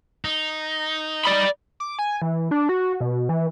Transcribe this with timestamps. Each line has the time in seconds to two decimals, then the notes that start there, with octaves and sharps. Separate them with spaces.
0.25 D#4
1.25 D5 B5
1.80 D6
1.99 G#5
2.22 E3
2.51 D4
2.69 F#4
3.00 B2
3.29 E3